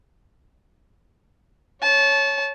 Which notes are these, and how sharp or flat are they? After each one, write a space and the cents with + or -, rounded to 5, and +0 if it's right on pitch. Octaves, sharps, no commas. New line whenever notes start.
C#5 +0 A5 -25